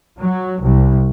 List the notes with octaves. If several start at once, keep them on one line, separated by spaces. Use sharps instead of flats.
F#3
C2